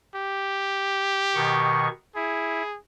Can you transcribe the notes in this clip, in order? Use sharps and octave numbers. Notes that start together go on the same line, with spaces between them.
G4
B2 D#3 C#6
E4 G#4